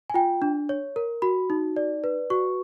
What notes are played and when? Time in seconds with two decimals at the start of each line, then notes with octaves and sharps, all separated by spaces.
0.10 G#5
0.14 F4 G5
0.42 D4
0.69 C#5
0.96 A#4
1.22 F#4 B5
1.50 D#4
1.76 D5
2.04 B4
2.30 F#4 C#6